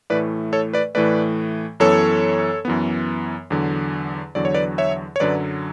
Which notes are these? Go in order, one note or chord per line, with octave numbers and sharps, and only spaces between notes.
A2 E3 A3 B4 D5
A4 C#5
B4 D5
A2 E3 A3 B4 D5
F#2 E3 B3 A4 C#5
F#2 E3 B3
E2 D3 F#3
E2 D3 F#3 D5
C#5
B4 D5
C#5 E5
C#5
F#2 D3 F#3 B4 D5